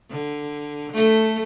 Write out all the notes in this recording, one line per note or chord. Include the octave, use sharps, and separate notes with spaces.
D3
A3 A4